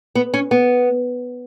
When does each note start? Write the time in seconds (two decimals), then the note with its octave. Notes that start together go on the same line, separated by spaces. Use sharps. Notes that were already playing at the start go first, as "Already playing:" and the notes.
0.15 B3
0.34 C#4
0.51 B3